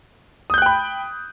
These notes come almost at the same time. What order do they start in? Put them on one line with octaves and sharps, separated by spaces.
D#6 G6 F#6 G5 B5